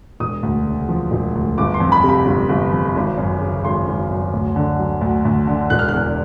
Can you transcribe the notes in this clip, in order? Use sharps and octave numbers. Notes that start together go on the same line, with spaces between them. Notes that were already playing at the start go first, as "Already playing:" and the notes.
E1 D#6
D2
C#3
F3
E1
D2
G1 D6
C6
F2
B5
C3
B5
G1
G1
F2
G#1
F#2
C#3
G#1 C6
G#1
F#2
D2
D3
F#3
D2
D2
D3
E1 F#6
F6
F#6
E2